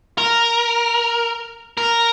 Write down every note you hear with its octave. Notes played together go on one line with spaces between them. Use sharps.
A#4
A#4